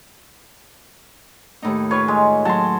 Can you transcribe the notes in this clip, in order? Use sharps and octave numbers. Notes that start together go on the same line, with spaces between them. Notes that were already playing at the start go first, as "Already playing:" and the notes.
D#2 A2 D#4
F4 B4 C#5
G#3
F#3 A5 C6